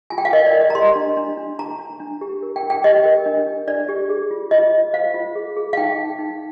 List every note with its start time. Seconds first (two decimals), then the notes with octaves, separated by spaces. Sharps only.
0.10 F4 G#5
0.18 G5
0.25 F5
0.33 A#4 D#5
0.47 D5
0.53 A#4
0.61 D#5
0.70 A#5
0.75 G4 C6
0.96 D4
1.17 D4
1.37 D4
1.58 D4 A#5
1.79 D4
2.00 D4
2.21 G4
2.43 A#4
2.56 G5
2.63 D4
2.70 G5
2.84 G4 D#5
3.05 A#4
3.26 D4
3.47 D4
3.68 D4 D5
3.89 G4
4.09 G#4
4.31 F4
4.51 F4 D#5
4.72 F4
4.93 C5 F5
5.14 F4
5.35 G#4
5.56 G#4
5.73 F5
5.77 D#4 G5
5.98 D#4
6.19 D#4